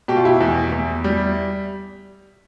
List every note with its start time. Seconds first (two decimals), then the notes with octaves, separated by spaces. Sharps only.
0.08 B2 G4
0.17 F4
0.25 E4 G4
0.40 E2
0.72 E2
1.04 G3